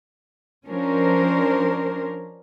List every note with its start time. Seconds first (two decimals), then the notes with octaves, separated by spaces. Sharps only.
0.67 F3 C#4 D4 A#4 C5